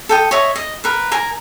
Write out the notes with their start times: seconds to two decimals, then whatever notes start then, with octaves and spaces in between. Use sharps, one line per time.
0.09 A4 G5 D#6
0.31 C#5 D#5 E5
0.56 D#5
0.84 A#4 B4
1.12 A#4 G#5 A#5